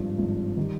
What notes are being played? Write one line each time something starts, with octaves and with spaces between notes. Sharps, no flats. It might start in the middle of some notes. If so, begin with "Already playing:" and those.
Already playing: G#1 G2 F3
G#1 G2 F3
D#3 G3